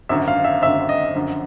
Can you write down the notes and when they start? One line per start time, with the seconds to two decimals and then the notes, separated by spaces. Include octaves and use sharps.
0.09 G#1 F#2 D3 E5
0.28 F5
0.44 E5
0.62 G#1 F#2 D3 E5
0.89 D#5
1.15 F#2 D3 F3